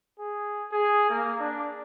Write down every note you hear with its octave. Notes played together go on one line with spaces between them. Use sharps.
G#4
G#4
A#3
D4